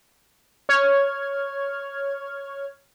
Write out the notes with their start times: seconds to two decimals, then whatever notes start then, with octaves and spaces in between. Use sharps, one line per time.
0.69 C#5 F6 G#6